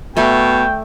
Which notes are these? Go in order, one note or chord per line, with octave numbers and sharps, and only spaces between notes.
B2 A3 D5 G5 G#5